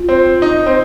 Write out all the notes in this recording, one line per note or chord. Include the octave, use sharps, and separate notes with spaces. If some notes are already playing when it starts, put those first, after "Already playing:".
Already playing: F4
C4
D#4
C4